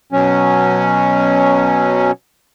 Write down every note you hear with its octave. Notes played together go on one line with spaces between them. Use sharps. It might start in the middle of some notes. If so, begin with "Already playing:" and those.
B2 F#3 C#4